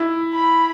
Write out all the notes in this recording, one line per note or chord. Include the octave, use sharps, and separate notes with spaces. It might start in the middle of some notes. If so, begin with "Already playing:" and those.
Already playing: E4
B5